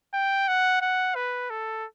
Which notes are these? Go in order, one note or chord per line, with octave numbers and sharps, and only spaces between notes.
G5
F#5
F#5
B4
A4